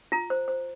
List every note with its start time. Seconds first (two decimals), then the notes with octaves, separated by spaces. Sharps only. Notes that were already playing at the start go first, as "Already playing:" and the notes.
0.12 F4 A#5
0.30 C5
0.48 C5